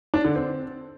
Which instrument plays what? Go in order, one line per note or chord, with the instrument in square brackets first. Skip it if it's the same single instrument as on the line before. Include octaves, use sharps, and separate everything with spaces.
[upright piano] D4
D3
C4